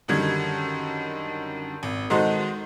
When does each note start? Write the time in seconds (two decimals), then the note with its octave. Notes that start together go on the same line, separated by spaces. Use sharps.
0.08 F#2 D3 D#3 G3 G#6
1.83 G#1
2.10 D#3 G#3 D#4 F#4 A4 C5